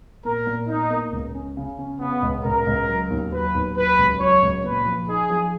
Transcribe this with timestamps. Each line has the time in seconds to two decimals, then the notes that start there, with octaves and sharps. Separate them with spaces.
0.25 A#2 A#4
0.47 A#2
0.69 A#2 D#4
0.90 A#3
1.12 C#2
1.35 C#4
1.57 C#3
1.78 C#4
2.00 C#3 B3
2.22 C#2
2.44 C#2 A#4
2.66 C#2
2.88 F#3
3.10 D#2
3.32 F#3 B4
3.54 D#2
3.76 F#3 B4
3.98 C#2
4.20 F#3 C#5
4.42 C#2
4.64 A#2 B4
4.86 F3
5.08 D#4 G#4
5.30 F3